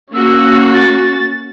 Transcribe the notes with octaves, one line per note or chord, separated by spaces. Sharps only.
A#3 C#4 F#4 E6
A6